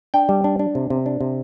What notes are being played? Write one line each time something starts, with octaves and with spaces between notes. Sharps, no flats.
D4 G5
G3
D4
D4
C3
C3
D4
C3